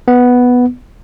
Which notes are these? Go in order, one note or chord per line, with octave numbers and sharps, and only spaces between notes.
B3